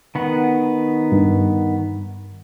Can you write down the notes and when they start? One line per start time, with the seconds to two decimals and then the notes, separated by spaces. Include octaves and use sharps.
0.15 D#3 B3 F#5
1.12 G2